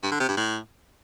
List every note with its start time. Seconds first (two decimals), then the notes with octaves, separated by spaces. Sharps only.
0.03 G2
0.12 D3
0.20 C3
0.28 G2
0.37 A2